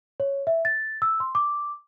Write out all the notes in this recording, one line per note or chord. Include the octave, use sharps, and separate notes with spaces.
C#5
E5
A6
E6
C6
D6